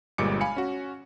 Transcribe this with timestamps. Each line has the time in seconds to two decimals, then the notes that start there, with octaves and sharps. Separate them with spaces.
0.18 G1 A#2 G3 G#3 D6 C#7
0.41 F5 G#5 B5 C#7
0.57 C#4 F#4